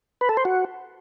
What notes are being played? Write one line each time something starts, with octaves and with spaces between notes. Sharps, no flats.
B4
A4
C5
F#4